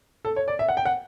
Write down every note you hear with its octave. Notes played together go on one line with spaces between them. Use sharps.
A4
C#5
D5
E5
F#5
G5
F#5